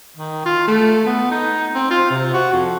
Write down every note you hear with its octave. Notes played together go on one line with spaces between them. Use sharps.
D#3
F4
A3
B3
D#4
C4
F4
C3
F#4
F2